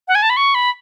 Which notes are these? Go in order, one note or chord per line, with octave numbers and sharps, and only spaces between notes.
F#5
G#5
A5
B5
C#6
B5